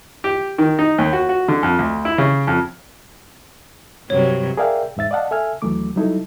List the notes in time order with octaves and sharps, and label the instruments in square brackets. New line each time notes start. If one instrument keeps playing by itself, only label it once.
[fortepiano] G4
D#3
D#4
D#2
F#4
F#4
D3
F2
D2
E4
C#3
F2
[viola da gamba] G2 C3 F#3 [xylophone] C#5
[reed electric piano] G#4 A#4 D5 E5 F5 G5
E2 G#2 E5 A6
D5 D#5 F5 F#5 A5
A4 E5 G#5 F6
D#2 E3 F#3 A3 D6
F#3 G3 D#4 E4 A4